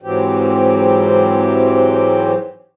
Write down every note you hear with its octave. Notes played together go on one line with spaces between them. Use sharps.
G#2 E3 F#3 C4 G4